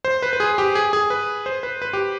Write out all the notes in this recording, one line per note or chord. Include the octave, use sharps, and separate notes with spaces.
C5
B4
B4
G#4
G4
G#4
G#4
B4
C5
B4
B4
G4